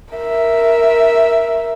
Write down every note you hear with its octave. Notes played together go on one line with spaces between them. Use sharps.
A#4 E5